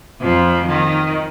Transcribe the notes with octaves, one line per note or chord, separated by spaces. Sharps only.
F2 F3
D#3